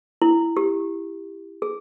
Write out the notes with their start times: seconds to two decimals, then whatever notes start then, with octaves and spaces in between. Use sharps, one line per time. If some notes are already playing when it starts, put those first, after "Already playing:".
0.22 E4
0.57 G4
1.62 G#4